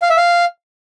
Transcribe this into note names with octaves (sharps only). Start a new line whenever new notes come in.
F5
E5
F5